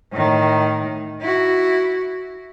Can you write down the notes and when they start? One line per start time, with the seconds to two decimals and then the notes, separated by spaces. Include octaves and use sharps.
0.12 A2 D#3
1.21 E4 F#4